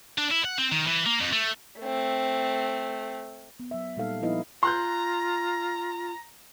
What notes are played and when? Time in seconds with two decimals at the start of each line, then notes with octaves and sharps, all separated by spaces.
0.18 D4
0.31 E4
0.44 F#5
0.58 C4
0.72 D#3
0.87 E3
1.06 A#3
1.21 F2
1.33 A3
1.80 A3 C4
3.60 B3
3.71 F#3 E5
3.96 A#2 G3 A#3 D#4 A4 F5
4.22 F3 B3 D#4 E4 B4 D#5
4.63 F4 A#5 C6 F#6 G6